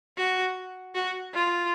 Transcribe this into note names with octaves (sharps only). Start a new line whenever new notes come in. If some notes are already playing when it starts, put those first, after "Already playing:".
F#4
F#4
F4